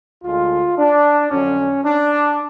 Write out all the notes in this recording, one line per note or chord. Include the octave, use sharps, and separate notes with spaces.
D2 D3 G#3 F4
D4
F2 D3 F#3 C#4
D4